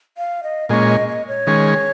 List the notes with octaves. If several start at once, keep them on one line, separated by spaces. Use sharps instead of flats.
F5
D#5
A#2 G#3 C#4 D#5
D#5
D#5
C#5
D#3 G#3 C#4